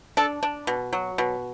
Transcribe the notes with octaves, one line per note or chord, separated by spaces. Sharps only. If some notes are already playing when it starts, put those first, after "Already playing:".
D4 A4
D4
B2
F#3
B2